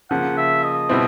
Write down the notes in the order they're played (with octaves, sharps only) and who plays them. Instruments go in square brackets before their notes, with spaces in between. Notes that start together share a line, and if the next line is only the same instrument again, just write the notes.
[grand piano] C#3 F3 A#3 [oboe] F#5
[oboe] E5
D#5
[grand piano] B2 G3 C4 E4